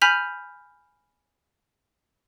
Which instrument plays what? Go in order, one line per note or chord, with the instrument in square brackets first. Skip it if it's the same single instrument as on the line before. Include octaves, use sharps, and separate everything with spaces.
[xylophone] G#5 B5 F6 G6 B6 F7